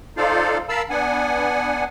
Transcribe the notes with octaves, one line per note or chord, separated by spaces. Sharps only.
D#4 F4 A4 C5 D5 F5
A#4 F5 A5 B5 E6
B3 D4 F#5 G#5